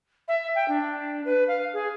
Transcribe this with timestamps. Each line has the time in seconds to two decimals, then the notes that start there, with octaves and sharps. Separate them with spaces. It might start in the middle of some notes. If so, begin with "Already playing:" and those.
0.28 E5
0.55 G5
0.68 D4
1.25 B4
1.48 F5
1.73 G#4